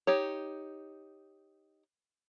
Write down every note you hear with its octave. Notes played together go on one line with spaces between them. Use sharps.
D#4 G4 C#5